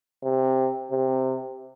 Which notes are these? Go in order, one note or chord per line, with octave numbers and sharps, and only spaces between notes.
C3
C3